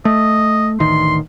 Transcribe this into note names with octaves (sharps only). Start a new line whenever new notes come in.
A3 D#5
A1 D2 D#3 C6